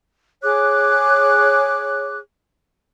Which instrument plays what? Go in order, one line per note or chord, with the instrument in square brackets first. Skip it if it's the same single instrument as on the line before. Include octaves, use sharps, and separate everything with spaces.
[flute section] G#4 C#5 D6 F#6